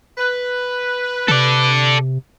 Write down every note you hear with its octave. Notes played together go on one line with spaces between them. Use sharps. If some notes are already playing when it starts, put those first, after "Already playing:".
B4
C3 A4 D5